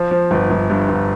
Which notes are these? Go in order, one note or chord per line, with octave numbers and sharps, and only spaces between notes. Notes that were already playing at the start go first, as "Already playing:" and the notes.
Already playing: F3
F3
G1
G1
G2
G1